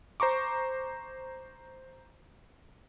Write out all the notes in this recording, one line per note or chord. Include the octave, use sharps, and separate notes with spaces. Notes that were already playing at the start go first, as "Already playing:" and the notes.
C5 A#5 C#6 D6